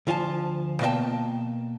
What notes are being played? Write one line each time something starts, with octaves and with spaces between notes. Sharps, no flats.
D2 F3 F4 G#5 A5
B2 A#3 A#4 D#5 G5 A5